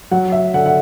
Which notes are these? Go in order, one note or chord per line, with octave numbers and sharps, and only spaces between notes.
F#3 F#5
E5
D3 F#5
F#5